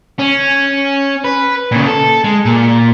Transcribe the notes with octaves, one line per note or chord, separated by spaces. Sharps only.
C#4
B4
A#2 C#3
A4
G#3
A#2